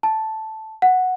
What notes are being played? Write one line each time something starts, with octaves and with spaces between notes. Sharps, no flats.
A5
F#5